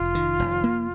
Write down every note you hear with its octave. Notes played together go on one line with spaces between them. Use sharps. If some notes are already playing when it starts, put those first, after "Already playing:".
Already playing: F1 F4
D#3
F1
A#3